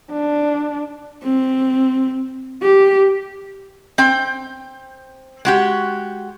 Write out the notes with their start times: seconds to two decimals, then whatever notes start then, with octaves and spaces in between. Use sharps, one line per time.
0.11 D4
1.23 C4
2.62 G4
3.98 C4 G5
5.45 G#3 F#4 G4